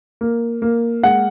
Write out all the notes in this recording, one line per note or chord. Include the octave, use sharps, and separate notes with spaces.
A#3
A#3
G#3 F#5